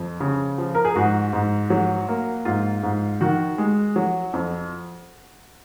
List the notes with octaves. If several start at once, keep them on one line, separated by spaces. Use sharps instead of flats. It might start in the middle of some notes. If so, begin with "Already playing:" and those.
Already playing: F2
C#3
F3
A#4
G#4
G#2 F#4
G#2
F#3
A#3
G#2 F4
G#2
D#3 F#4
G#3
F#3
F2